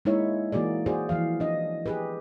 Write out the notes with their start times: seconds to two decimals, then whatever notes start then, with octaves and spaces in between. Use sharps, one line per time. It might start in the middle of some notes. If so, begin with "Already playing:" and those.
0.05 G#3 A#3 D#4 E4 C#5 E5
0.52 E3 A#3 F#4 G#4 D5
0.86 F#4 G#4 C5 D5
1.09 E3 F3 F5
1.40 D4 D#5
1.86 G4 G#4 B4